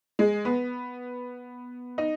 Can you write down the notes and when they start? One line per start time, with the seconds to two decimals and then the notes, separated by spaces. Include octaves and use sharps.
0.19 G#3
0.45 B3
1.98 D#4